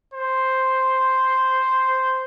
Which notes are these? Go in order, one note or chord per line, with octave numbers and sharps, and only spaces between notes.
C5